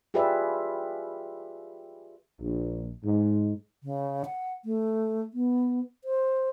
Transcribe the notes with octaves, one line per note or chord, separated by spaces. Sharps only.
F4 G4 G#4 B4 D5 E5
A#1
G#2
C#3
F#5
A3
B3
C5